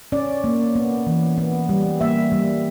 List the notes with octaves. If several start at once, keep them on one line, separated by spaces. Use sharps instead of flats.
C#4 D5
A#3
B3
E3
B3
G3
A#3 E5
G3